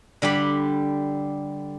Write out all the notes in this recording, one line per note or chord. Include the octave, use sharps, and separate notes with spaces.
D3 G3 G4 B5